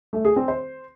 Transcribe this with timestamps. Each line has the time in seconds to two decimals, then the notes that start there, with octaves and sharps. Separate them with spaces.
0.13 A3
0.25 G#4
0.36 C4
0.48 C5